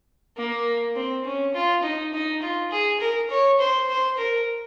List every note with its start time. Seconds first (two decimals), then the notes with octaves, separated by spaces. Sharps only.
0.37 A#3
0.96 C4
1.24 C#4
1.54 F4
1.83 D#4
2.13 D#4
2.42 F4
2.71 G#4
3.00 A#4
3.30 C#5
3.58 C5
3.89 C5
4.17 A#4